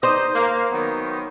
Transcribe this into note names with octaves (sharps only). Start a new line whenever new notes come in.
D#4 C5 D5 D#5
A#3
D#3 F#3 B3